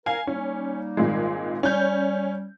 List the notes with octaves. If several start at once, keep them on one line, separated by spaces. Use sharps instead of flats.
A#4 F5 G#5
G3 A#3 C#4 D#4
G#1 A#2 G#3
G3 C#4 G6